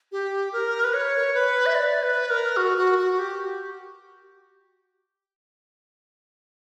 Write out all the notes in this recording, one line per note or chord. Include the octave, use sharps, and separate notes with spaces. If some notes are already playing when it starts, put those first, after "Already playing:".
G4
A#4
B4
C#5
B4
E5
D5
B4
A#4
F#4
F#4
F#4
G4